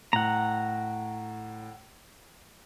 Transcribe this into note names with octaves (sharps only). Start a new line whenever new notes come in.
A2 F#5 A#5